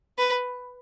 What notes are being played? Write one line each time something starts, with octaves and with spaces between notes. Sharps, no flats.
B4